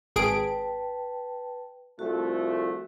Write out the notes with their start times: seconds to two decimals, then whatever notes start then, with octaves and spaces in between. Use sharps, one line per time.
0.16 G#1 G#4 B4 G5 A5 D7
1.99 C2 F3 A3 F#4